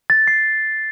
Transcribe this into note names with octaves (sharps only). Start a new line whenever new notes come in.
A6
C7